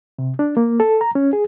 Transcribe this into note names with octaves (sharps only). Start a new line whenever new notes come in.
C3
D4
A#3
A4
A#5
C#4
G#4